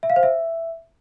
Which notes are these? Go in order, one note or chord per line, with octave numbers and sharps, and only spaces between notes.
E5
F5
C5
E5